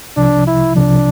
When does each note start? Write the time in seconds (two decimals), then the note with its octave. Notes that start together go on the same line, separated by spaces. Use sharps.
0.17 C2 C3 F3 D4
0.47 E4
0.76 C2 C3 F3 D4